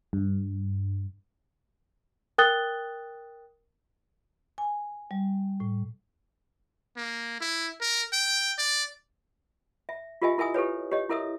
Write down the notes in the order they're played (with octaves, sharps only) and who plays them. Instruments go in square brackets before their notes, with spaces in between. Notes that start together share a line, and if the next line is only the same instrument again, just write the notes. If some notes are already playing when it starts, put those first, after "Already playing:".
[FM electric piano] G2
[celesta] A#4 G5 D#6 F#6 A6 G7
[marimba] G#5
G3
A2
[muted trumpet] A#3
E4
A#4
G5
D5
[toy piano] E5
F4 G4 A#4 D#5 E5 G#5
E4 A#4 E5 G#5 D#6
G4 A4 B4 C#5
G4 C#5 D#5
E4 A4 A#4 E5 D#6